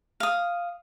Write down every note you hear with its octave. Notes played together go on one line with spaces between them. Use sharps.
F5 D#6